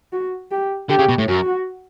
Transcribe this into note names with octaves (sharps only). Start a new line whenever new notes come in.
F#4
G4
D3 G4
C#3
B2
A2
F#2 F#4